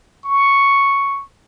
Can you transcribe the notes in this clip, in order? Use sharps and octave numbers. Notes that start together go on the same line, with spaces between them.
C#6